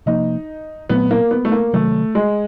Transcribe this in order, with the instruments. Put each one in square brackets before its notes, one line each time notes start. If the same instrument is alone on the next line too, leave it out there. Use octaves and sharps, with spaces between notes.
[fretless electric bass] C3 F3 A#3 [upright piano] D#4
[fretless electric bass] A#2 F#3 A3 C4 [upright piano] B3
[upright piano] A#3
B3
A3
A#3
[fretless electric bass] C3 D#3 F#3 [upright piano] A3
[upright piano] G#3